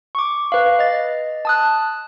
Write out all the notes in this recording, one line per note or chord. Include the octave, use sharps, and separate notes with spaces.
C#6 D6
B4 F5
D#5 A6
A5 D#6 F#6